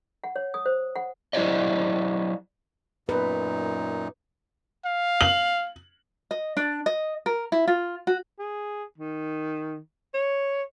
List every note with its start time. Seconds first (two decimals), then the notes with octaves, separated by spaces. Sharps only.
0.24 F#5
0.36 C#5
0.54 D#6
0.66 C5
0.96 F#5
1.33 F#3 E4 G4 C5 D5 D#5
3.09 F#2 A#2 D#4 B4
4.85 F5
5.21 F#7
6.31 D#5
6.57 D4
6.86 D#5
7.26 A#4
7.52 E4
7.68 F4
8.07 F#4
8.39 G#4
8.98 D#3
10.14 C#5